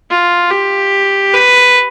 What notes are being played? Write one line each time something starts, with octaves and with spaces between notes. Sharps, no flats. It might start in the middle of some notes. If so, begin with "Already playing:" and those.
F4
G4
B4